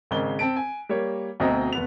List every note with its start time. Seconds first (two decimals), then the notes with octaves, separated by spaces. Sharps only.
0.11 G#1 C#3 G#3 A#4 G7
0.39 C4 A5 D7
0.56 G#5
0.89 G3 A#3 C#5
1.40 D2 B2 C4 D#5 A#5
1.73 F1 B3 F7